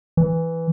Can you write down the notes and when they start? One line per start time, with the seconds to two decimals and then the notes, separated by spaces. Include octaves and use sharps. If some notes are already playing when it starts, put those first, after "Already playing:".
0.17 E3